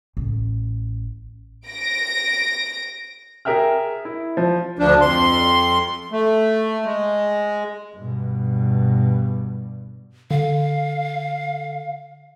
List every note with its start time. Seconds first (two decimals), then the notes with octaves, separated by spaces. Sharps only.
0.17 A1
1.68 A#6 D7
3.45 G#4 A#4 E5 G5 F6
4.05 E4
4.37 F3
4.79 D2 F3 D4
5.01 F2 C6
6.12 A3
6.85 G#3
7.96 G2 B2
10.31 D3 F5